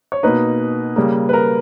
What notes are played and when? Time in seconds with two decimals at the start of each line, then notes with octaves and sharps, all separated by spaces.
0.12 C#5
0.23 B2 A#3 D#4 B4
0.96 C#3 G3 A#3
1.29 B4
1.33 A#4